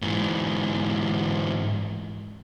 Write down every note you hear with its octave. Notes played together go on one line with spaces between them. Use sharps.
G#2 E3